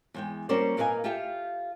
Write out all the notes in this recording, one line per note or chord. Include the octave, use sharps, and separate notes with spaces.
E2 G#3 G5
G3 A#3 C#4 F#4 C5 D5
A#2 A#3 B4 D#5 F5 G#5
F4 G4 A4 E5 F5 G5